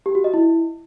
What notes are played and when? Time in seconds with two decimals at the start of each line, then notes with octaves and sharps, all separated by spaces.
0.06 G4
0.15 F#4
0.24 D#5
0.34 E4